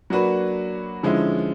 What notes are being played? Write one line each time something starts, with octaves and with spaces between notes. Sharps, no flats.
F#3 A#3 D4 F#4 B4
D3 F3 G#3 C#4 E4